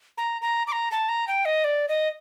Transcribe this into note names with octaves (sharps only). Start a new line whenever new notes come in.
A#5
A#5
D6
A#5
A5
A#5
G5
D#5
D5
D#5